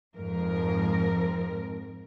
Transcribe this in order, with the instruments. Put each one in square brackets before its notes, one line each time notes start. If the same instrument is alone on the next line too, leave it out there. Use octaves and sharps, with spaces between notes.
[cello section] F2 G#2 A#4